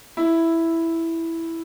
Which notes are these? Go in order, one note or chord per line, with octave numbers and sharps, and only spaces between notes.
E4